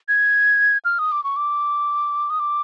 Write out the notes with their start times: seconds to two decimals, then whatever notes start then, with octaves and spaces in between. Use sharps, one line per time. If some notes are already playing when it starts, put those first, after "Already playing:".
0.08 G#6
0.85 F6
0.99 D#6
1.12 D6
1.24 C#6
1.36 D6
2.30 D#6
2.40 D6